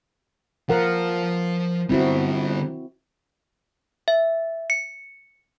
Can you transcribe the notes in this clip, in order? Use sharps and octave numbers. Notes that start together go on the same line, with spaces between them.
F3 F4 A#4 F#5
D3 G3 C4 E4 F#4
E5
C#7